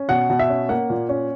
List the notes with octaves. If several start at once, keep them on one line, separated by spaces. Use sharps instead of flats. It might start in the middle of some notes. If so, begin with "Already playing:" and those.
Already playing: C#4
B2 F#5
B2
E5
C#4
A#3 F#5
A#2
C#4